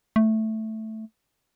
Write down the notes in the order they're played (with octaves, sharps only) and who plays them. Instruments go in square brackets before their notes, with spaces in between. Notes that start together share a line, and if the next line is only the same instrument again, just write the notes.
[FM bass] A3